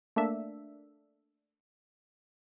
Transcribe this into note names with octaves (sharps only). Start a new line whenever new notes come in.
A3 A#3 D4 E5